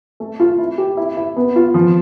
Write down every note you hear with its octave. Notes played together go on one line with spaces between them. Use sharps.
A3
F4
E4
G4
E4
E4
B3
F4
F3